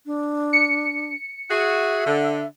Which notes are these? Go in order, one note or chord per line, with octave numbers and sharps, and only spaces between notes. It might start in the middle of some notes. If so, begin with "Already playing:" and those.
D4
C#7
F#4 G#4 E5
D3